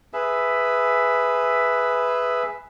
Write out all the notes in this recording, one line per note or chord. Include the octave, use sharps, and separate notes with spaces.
G#4 B4 E5